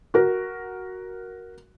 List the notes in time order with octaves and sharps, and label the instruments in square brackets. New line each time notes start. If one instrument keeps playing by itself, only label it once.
[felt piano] F#4 A#4